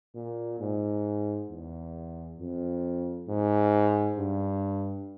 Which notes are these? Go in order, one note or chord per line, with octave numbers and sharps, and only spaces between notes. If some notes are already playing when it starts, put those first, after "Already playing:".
A#2
G#2
E2
F2
G#2
G2